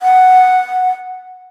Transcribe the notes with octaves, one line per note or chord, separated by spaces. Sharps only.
F#5